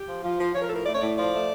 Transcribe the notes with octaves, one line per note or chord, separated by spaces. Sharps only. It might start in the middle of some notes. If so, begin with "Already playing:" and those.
Already playing: G4
F3
F3 F4
F3
F3 C#5
A#4
A2 A4
A#4
A3 D5
C#5
A2 D5
F3 D5
A3